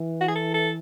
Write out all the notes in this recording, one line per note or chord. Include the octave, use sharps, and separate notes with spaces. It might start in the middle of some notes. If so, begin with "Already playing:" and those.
Already playing: E3
F#4
G#4
A4
A4